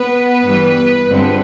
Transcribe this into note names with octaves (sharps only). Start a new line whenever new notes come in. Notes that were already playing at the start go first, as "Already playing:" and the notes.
Already playing: B3 B4
G2 E3 G3 B3
G2 D3 F3 G#3 C4